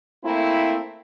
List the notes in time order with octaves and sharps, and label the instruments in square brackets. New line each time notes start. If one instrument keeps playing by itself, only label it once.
[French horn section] A3 A#3 C4 E4